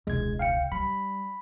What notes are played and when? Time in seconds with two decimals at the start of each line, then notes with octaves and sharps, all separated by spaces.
0.07 E1 C#2 G#3 G#6
0.39 F5 G5 C#7
0.72 G3 B5